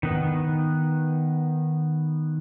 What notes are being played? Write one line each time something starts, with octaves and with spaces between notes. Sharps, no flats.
D#3 B3